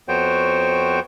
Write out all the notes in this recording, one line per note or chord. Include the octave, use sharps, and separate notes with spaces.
F2 B3 F#4 C5 C#5 G5